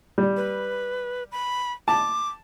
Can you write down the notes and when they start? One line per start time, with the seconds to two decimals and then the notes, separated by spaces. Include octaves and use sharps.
0.18 G3
0.37 B4
1.32 B5
1.88 A5 D6